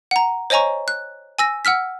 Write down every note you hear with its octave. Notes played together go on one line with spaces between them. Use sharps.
F#5 A#5
C5 C#5 D#5 G#5 A#5 C#6
F#6
G#5 E6 A#6
F#5 E6 F6 B6